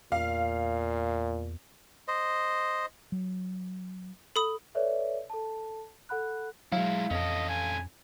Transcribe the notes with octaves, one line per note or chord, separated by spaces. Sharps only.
E2 A#2 F5
C5 D#5
F#3
A4 B5 D#6
A4 B4 C#5 D5 E5
A4 A5
A4 F#5 B5 F#6
F#3 G#3 E4 F5
F2 C#4 A4 D#5
G#5